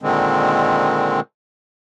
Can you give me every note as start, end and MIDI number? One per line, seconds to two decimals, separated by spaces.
0.02 1.20 46
0.02 1.20 50
0.02 1.20 51
0.02 1.20 56
0.02 1.20 60